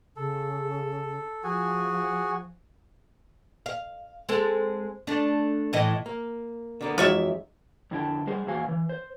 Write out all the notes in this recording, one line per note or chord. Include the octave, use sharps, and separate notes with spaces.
C#3 A4
F3 F#4 G#4 G#5
F5
G#3 C4 A4
A3 D4
A2 E3 D#5
A#3
D3 A#3 B3
F2 E3 F#3 G#3 D#4 F4 C#5 E5
F2 D3 E4 G5 A5
G3 G#4 C5
E2 A#2 F#3 F#4 F5 G#5
E3
C5